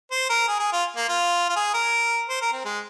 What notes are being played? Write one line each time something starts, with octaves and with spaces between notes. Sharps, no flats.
C5
A#4
G#4
G#4
F4
A#3
F4
F4
G#4
A#4
C5
A#4
C4
G#3